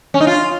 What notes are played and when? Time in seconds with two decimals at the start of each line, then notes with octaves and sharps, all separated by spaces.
0.14 C#4
0.21 D#4
0.27 F4